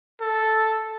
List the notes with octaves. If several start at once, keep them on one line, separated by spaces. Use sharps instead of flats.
A4